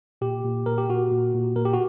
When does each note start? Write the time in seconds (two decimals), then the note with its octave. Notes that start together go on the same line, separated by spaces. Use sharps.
0.21 A#2 G4
0.44 A#2
0.66 A#2 A#4
0.78 G4
0.89 A#2 F#4
1.11 A#2
1.34 A#2
1.56 A#2 A#4
1.65 G4
1.73 F#4